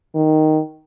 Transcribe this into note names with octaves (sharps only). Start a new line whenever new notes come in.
D#3